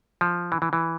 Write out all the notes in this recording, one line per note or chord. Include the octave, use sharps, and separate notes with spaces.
F3
E3
E3
E3